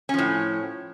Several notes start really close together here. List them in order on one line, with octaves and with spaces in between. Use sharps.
C#4 F3 A2